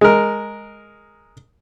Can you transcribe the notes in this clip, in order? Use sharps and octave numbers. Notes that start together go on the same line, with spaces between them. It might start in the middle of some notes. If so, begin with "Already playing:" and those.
G#3 A#4